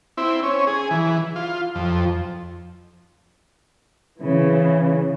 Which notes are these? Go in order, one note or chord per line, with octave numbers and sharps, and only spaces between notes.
C4 E4
C#4
G#4
E3
F4
F2
C#3 E3